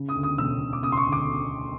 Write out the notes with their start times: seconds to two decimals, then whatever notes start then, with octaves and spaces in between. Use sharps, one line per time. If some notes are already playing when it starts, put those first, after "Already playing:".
Already playing: C#3
0.09 D#6
0.15 D2
0.23 D#6
0.38 E1 E6
0.60 E1
0.73 D6
0.83 C#3 D#6
0.92 C6
0.97 C#6
1.06 D2
1.12 D6